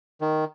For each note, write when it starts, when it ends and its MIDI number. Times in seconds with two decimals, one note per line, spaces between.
0.21 0.45 51